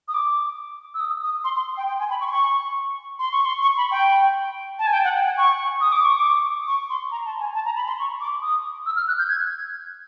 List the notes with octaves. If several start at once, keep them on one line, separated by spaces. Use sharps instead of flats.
D#6
D6
E6
D#6
D#6
C6
C6
G5
G5
G#5
B5
C#6
C6
C#6
C6
C#6
C6
C#6
B5
G5
A5
G#5
G5
F#5
G5
G#5
C#6
D#6
D6
C#6
D6
C#6
C6
A#5
A5
G#5
A5
A#5
B5
C6
C#6
D6
D#6
E6
F6
F#6
G6
G#6